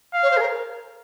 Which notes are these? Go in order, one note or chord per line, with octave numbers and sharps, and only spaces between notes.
F5
C#5
C5
G#4
A#4